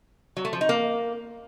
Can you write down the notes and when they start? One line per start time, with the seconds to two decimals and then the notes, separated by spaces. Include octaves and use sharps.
0.37 F#3
0.45 A3
0.53 F3
0.61 D#4
0.69 A#3